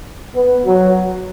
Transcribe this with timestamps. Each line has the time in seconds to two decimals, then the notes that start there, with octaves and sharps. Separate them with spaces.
0.34 B3
0.66 F#3